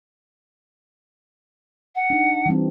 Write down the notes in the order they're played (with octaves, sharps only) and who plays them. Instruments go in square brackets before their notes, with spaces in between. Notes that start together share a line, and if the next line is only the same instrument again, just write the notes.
[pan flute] F#5
[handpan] D4 D#4
E3 G3 C4